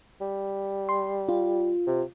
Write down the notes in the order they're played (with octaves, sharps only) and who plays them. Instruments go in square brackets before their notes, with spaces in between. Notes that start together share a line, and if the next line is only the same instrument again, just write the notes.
[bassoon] G3
[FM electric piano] C6
F4
[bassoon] C3